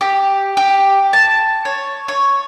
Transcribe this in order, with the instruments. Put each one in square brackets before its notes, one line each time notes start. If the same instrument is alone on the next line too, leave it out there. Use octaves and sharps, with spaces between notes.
[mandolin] G4
G4
A5
C#5
C#5